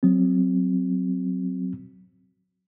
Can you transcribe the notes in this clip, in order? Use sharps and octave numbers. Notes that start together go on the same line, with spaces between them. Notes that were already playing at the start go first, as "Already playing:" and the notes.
F#3 C4